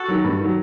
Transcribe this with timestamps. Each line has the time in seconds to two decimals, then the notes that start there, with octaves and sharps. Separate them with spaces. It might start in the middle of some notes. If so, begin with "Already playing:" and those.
Already playing: F#4 A4
0.08 D#3 F#3
0.24 G2
0.41 D#3 F#3